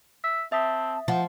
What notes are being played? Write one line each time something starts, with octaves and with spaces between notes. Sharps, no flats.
E5
C4 E5 A5 D#6 B6
F3 F#5